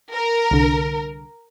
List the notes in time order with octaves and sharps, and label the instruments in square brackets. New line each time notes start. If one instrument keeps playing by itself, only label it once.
[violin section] A#4
[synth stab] C2 D3